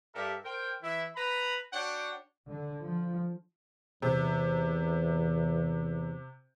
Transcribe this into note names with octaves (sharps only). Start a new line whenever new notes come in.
G2 G4 A4 A#4 E5
A#4 C5 G5
E3 E4 E5
B4 A#5 B5
D4 F#4 C#5 F#5 G5
D3
F3
E2 C3